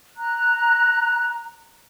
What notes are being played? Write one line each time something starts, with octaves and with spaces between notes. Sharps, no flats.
A#5 F#6